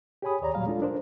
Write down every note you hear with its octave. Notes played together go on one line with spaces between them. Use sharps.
G4 G#4 C#5 G#5 B5 D#6
D#2 C#5 D5 A#5
A#2 F#3 G3 F5 A#5
G#3 D4 F4 A4
D4 A#4 C5